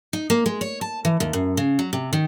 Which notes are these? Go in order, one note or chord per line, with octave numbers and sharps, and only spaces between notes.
D#4
A#3
G#3
C#5
A5
E3
D#2
F#2
C#3
F#3
C3
D#3